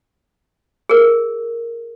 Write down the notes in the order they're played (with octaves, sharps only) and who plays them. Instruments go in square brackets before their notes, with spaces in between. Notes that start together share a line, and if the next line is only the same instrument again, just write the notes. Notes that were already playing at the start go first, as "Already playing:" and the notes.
[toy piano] G#4 A#4